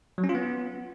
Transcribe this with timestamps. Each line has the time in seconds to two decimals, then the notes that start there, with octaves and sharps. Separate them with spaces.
0.18 F#3
0.24 C#4
0.29 F4
0.35 B3